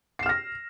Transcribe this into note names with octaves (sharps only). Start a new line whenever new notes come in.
F6 A#6 C7 E7